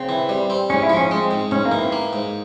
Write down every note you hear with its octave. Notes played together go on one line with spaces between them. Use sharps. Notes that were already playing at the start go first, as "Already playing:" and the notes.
Already playing: C#3 C4
E3
G3
C4
G#2 C#4
E4
F3
C#4
G#3 C4
G#2
G#2 C#4
A#3
E3
C4
A#3
G#2